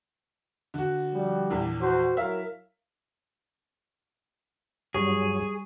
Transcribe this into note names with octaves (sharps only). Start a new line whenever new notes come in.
D3 F#4
F3 G3
A#1 E2
F#4 C5
F#3 E4 A#4 E5 F5
G2 F#3 G3 G#4 C#6